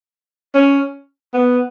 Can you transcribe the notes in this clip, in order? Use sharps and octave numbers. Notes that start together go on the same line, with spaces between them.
C#4
B3